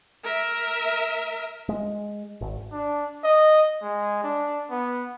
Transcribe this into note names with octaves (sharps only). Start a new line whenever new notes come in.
A#4 E5
G#3
G#1
D4
D#5
G#3
D4
B3